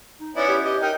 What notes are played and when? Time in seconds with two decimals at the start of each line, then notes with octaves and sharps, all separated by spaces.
0.20 D#4
0.36 B3 C#4 E4 D5
0.49 G4
0.63 G4 D#5
0.82 D#4 A#4 G5